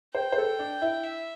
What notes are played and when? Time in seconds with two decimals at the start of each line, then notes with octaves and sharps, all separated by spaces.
0.15 C5 G5
0.32 C5
0.38 A4
0.59 D4
0.82 E4
1.03 E5